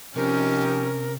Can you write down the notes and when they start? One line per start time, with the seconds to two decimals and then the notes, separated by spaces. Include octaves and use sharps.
0.16 C3 F3 C#4 D#4 G4 A#4